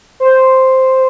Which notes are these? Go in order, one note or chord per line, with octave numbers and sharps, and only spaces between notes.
C5